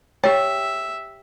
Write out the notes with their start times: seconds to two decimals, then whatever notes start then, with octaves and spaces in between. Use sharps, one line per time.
0.24 G4 C#5 E5 G5